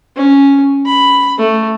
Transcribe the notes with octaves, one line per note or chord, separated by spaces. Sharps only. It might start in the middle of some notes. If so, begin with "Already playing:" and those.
C#4
B5
A3